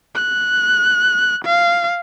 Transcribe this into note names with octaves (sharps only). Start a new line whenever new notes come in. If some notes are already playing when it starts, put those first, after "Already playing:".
F#6
F5